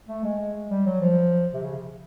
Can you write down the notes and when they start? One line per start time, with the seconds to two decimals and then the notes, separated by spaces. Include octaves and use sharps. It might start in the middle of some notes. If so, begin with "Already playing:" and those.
0.09 A3
0.24 G#3
0.70 G3
0.86 F#3
1.01 F3
1.54 C3
1.63 C#3